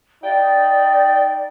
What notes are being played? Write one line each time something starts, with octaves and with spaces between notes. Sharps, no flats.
D#4 D5 G5